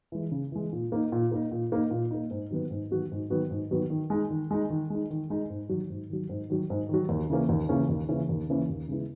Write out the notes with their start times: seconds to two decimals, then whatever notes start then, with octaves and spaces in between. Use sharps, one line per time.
0.12 E3 G#3
0.32 C#3
0.52 E3 G#3
0.72 A#2
0.92 A#3 D#4
1.12 A#2
1.32 A#3 D#4
1.51 A#2
1.72 A#3 D#4
1.91 A#2
2.11 A#3 D#4
2.31 G#2
2.51 D#3 F#3 B3 F#4
2.71 G#2
2.91 D#3 F#3 B3 F#4
3.11 G#2
3.30 D#3 F#3 B3 F#4
3.51 G#2
3.71 D#3 F#3 B3 F#4
3.90 D#3
4.10 G#3 D#4
4.30 D#3
4.51 G#3 D#4
4.70 D#3
4.90 G#3 D#4
5.10 D#3
5.30 G#3 D#4
5.50 G#2
5.69 D#3 F#3
5.90 G#2
6.10 D#3 F#3
6.29 G#2
6.50 D#3 F#3
6.70 G#2
6.89 D#3 F#3
7.09 D#2
7.30 C#3 E3 A#3 C#4
7.49 D#2
7.69 C#3 E3 A#3 C#4
7.89 D#2
8.09 C#3 E3 A#3 C#4
8.29 D#2
8.49 C#3 E3 A#3 C#4
8.69 D#2
8.88 C#3 G#3 B3 E4